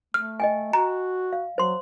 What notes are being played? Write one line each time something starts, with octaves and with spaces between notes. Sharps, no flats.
A3 F6
D#5 G5 G#5
F#4 A#5
F5
F#3 C5 C6